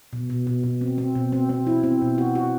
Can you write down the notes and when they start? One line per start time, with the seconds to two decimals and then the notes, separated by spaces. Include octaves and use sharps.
0.13 B2
0.30 B2
0.47 B2
0.63 B2
0.81 C4
0.98 C4
1.15 B2
1.32 C4
1.49 C4
1.67 E4
1.83 C4
2.01 B2
2.18 F#4
2.35 F#4